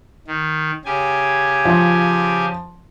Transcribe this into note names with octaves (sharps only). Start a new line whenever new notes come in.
D#3
C#3 G4 G#5
F3